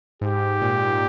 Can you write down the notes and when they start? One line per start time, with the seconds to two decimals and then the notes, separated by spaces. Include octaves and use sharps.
0.21 G#2 G4
0.62 A#2